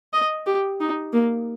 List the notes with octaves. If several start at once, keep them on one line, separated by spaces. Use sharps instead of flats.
D#5
G4
D#4
A#3